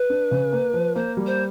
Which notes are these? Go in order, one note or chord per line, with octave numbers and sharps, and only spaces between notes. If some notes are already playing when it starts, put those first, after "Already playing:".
Already playing: B4
D4
C#3
A#3
F3
A#3 C5
G3
C5